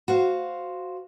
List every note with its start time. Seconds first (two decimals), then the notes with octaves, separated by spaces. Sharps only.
0.08 F#4 C5 F5